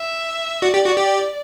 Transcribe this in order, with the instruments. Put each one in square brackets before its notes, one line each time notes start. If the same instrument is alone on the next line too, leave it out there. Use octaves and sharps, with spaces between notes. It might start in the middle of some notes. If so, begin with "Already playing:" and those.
Already playing: [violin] E5
[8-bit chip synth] F#4 [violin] D5
[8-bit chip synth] G4
F#4
G4